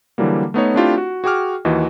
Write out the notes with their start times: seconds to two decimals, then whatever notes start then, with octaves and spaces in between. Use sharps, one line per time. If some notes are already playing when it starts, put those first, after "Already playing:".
0.18 D3 E3 F#3 G3 A#3
0.54 A3 B3 D#4 C#5
0.74 A3 C4 D4 E4 F4 G4
0.98 F#4
1.24 F#4 G#4 G5 D6 F6
1.65 D#2 E3 F#4 D#5